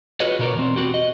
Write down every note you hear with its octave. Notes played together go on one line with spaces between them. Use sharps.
F4 F#4 G#4 B4 C#5 D#5
B2 C#4 A#4 C#5 D5
E2 C4
C4 F#4 G4
D#5